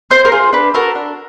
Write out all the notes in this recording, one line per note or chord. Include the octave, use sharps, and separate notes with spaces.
C4 C5
A#4
F4 G#4
D4 B4
F#4 A4 A#4
D4